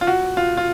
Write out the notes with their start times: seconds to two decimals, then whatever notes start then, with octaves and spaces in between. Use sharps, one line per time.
0.01 F4
0.07 F#4
0.37 F4
0.57 F4